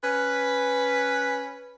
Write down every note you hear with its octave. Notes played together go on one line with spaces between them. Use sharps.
C#4 B4